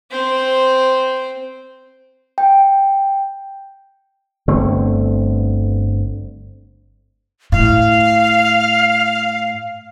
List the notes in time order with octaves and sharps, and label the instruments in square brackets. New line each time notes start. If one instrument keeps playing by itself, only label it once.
[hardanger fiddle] C4 C5
[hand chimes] G5
[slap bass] G1 D3 A3 C4
[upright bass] A2 [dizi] F5